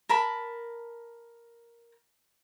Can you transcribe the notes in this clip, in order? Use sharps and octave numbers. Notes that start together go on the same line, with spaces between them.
A#4 A5 B5